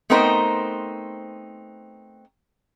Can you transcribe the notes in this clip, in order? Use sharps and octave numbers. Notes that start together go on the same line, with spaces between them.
A3 B3 C4 D#4 A#4 C5